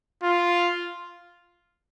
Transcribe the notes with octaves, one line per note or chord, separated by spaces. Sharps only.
F4